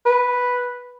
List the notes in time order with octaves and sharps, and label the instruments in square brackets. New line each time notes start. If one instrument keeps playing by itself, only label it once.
[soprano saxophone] B4